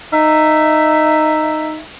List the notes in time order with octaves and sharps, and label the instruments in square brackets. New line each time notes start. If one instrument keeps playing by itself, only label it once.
[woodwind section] D#4 E5